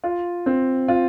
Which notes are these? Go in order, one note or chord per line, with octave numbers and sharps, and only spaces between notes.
F4
C4
F4